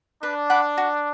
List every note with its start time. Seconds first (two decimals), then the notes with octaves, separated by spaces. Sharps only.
0.22 D4 B4
0.50 F#5 B5 D6
0.77 F#4